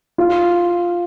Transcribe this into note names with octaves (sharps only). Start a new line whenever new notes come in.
F4